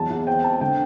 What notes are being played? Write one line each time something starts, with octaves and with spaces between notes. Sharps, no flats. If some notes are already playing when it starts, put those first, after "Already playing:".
Already playing: E2 F#3 A5
E2
C4 G5
C4 A5
D3 G5